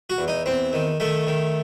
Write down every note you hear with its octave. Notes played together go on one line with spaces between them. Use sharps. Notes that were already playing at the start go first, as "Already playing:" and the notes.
F#4
E2
D#4
E2 C4
D#3
D#3 A3
D#3